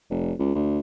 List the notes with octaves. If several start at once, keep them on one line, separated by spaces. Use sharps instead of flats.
F1
C#2
D2